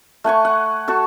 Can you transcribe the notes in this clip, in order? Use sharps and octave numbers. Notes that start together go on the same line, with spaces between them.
A3 F#5 G#5 C#6
F#5
F#4 A4 C#6